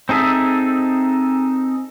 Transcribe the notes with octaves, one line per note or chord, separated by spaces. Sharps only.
C4 D#4 G#4 A4 E5